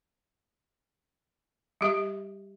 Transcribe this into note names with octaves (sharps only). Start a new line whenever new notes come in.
G3 G4 E5